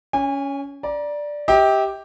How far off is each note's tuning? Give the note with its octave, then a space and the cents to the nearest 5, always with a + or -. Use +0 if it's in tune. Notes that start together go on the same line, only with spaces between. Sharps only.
C#4 +15 G#5 -30
D5 +0 A#5 +30
G4 +0 E5 -45 G5 +0